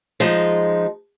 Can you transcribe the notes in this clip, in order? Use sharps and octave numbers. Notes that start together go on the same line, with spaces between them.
F3 G#3 D#4